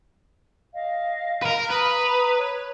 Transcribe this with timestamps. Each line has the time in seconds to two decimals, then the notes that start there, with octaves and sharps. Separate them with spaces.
0.74 D#5 F5
1.42 A#4 B4
1.70 B4 A#5 D#6
2.36 C#5 F#6